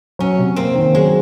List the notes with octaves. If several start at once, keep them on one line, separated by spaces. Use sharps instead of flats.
F#3 C#4
C3
A#3 C4
D#3
F#3 G#3